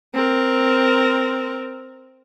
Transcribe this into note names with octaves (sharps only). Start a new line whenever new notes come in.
C4 A#4